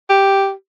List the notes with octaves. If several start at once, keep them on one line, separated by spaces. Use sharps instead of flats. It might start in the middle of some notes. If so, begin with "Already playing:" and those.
G4